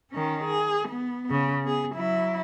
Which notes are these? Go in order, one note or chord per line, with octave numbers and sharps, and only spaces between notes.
D#3 C#4
G#4
B3
C#3
B3 G#4
F#3 E4